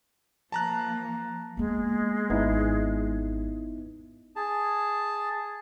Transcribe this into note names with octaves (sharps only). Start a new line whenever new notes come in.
F3 A#3 A5 A#5 F#6
G#3 A#3 B3
G#1 B3 D#4 E4
G#4 A5